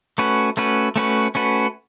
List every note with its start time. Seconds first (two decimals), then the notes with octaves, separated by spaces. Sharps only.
0.18 A3 C#4 F#4 B4
0.57 A3 C#4 F#4 B4
0.96 A3 C#4 F#4 B4
1.35 A3 C#4 F#4 B4